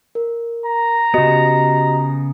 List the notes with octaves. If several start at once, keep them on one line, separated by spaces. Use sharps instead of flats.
A#4
A#5
C#3 B3 F#4 G4 D#5